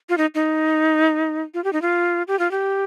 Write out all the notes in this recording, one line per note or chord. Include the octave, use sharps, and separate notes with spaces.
F4
D#4
D#4
F4
G4
D#4
F4
G4
F4
G4